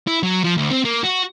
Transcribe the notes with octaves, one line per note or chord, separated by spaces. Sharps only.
E4
F#3
F3
D2
C4
A#3
F#4